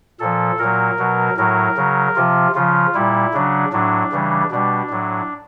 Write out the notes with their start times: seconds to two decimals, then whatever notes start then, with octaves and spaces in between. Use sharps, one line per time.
0.20 A#2 F3 A4
0.59 A#2 F#3 A#4
0.99 B2 F#3
1.37 A2 F#3 A#4
1.77 C#3 F#3
2.16 C3 F3 F4
2.55 C#3 F3 F4
2.95 A#2 G3 E4
3.34 C#3 F#3 D4
3.73 A2 F#3 D4
4.12 C#3 E3 G3
4.51 B2 G3 D4
4.90 A2 F#3